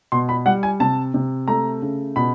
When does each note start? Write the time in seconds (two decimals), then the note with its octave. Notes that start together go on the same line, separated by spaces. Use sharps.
0.12 B2 C6
0.29 B5
0.46 G3 F#5
0.63 G#5
0.80 C3 A5
1.14 C3
1.48 A3 A#5
1.82 C#3
2.16 B2 B5